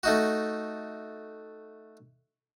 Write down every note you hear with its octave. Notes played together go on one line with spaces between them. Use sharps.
A3 D#4 F#4